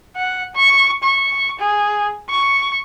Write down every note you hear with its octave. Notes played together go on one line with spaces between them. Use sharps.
F#5
C#6
C#6
G#4
C#6